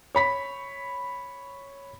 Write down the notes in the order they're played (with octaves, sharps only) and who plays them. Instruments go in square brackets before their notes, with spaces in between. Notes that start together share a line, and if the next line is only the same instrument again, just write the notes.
[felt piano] C#5 B5 B6